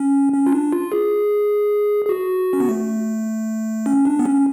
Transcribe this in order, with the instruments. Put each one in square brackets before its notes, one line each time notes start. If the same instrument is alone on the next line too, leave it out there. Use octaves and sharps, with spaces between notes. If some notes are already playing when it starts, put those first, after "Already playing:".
Already playing: [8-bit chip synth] C#4
C#4
F4
D4
F4
G#4
G#4
F#4
C#4
B3
A3
C#4
D4
B3
C#4